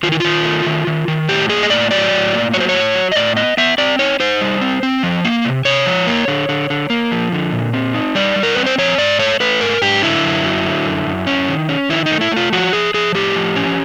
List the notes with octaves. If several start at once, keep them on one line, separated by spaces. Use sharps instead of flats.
D#3 F4
E4
D#3 F4
A3
D#3
D#3
D#3
A2 G4
A#3 G#4
D#5
A2 D5
F#3 D5
A2
A#3
F#3 C#5
C5
C#5
A2
F#3
D#5
A2 D5
B3 D#5
B3 E5
C4 D5
D#4 C#5
D#4 C5
G3
C4
C4
F3
A#3
C3
C3 C#5
F3
A#3
D3
D3
D3
A#3
F3
D3
A#2
C4
D#4
G3 D5
G3
A#4
C4 B4
C5
F3 C#5
G#2 D5
A3 C#5
A3 B4
G#2 A#4
G#2 G4
D3 E4
F#2
F#3
D3
F#2
F#2
C#4
D#3
C#4
D#3 E4
D#4
A3
E4
A3 F4
F3 F#4
F3 G#4
F3 G#4
A2 G4
F3
C#4